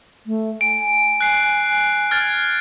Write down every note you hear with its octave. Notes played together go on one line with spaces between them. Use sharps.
A3
G#5 D7
F#6 C7
F6 G#6 A6